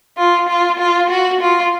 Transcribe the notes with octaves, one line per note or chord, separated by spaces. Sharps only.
F4
F4
F4
F#4
F4